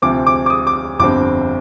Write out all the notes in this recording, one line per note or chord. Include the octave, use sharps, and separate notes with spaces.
D2 C3 F3 C4 D6
D6
D6
D#6
D6
G1 F2 D3 G3 C4 D6